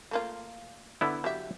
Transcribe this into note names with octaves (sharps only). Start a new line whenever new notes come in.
A3 A#3 F4
D3 B3 E4
F#3 G4 E5